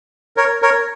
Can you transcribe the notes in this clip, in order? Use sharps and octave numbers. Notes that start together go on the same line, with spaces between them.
A#4 C#5
A#4 C#5